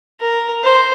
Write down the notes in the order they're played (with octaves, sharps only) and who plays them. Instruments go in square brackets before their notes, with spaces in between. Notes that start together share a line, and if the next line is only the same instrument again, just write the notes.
[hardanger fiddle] A#4
C5